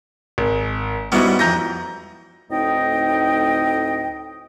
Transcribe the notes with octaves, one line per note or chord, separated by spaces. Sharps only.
G#1
G#2 G3 B3 C#4 E4 F#4
F2 E3 A#5 G6 A#6
D2 A2 C4 D#4 D#5 G5